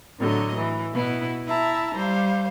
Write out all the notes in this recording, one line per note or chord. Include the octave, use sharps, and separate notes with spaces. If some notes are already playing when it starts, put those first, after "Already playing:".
A2 D3 F#3 D#5
E3
B2 B3 E4
E4 E5 A5 A#5
G3 C5 F5